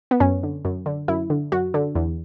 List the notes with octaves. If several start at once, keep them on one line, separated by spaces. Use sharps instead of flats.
B3
F#2 C#4
D3
F#2
D3
F#2 E4
D3
F#2 F#4
D3
E2